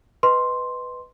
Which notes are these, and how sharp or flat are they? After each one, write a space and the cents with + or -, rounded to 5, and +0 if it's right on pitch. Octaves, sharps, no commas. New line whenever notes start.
B4 +5 D#5 +0 C6 +0